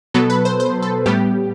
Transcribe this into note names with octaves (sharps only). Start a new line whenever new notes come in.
B2 F#3 B3 A4
B4
C5
C5
A4
A2 G3 B3 G4